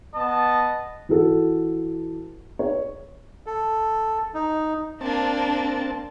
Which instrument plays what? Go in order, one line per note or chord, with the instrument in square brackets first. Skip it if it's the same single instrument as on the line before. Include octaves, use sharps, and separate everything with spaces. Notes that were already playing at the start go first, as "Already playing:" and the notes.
[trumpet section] B3 D#5 A5
[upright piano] E3 F#4 A4
C#5
[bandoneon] A4
D#4
[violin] A#3 D4 [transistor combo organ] C4 A5